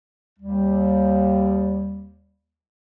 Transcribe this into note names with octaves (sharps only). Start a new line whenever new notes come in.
D#2 G3